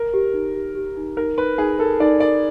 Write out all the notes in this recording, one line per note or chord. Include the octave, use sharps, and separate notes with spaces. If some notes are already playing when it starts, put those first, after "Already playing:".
Already playing: A#4
G4
D#4
G4
G4
D#4
D#4 A#4
D#4 B4
D#4 G#4
A4 A#4
D#4 D5
A#4 D5